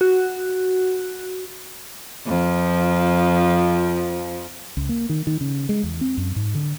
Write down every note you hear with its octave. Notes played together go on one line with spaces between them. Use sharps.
F#4
F2 F3
C#2
A#3
D#3
D#3
C#3
G#3
E2
C4
F#2
G#2
D3